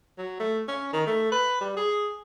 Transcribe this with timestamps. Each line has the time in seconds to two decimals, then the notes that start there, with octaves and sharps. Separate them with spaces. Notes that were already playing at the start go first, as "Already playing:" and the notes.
0.18 F#3
0.40 A3
0.68 C#4
0.93 D#3
1.06 A3
1.32 B4
1.61 G3
1.77 G#4